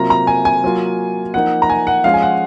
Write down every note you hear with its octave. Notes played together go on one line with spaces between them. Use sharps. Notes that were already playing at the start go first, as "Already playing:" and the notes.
Already playing: C3 F#3 A#3 F4 A#5
A#5
G#5
G#5
F#3 A#3 F4
F3 A#3 D#4 F#5
A#5
G#5
F#5
F3 G#3 C#4 F4 F5
G#5
F#5